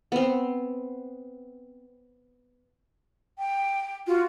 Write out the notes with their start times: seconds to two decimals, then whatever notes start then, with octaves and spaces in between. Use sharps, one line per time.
0.12 B3 C4
3.39 G5
4.07 F4 F#4